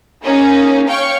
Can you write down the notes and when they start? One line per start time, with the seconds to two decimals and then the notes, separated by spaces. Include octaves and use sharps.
0.23 A#3 C#4 D#4 G#4
0.86 C#5 F5 G5 C#6